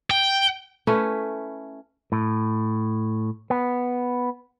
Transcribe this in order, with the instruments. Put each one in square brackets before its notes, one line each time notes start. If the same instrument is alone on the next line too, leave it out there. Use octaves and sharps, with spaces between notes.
[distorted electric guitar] G5
[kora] A3 C#4 E4 B4
[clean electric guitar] A2
B3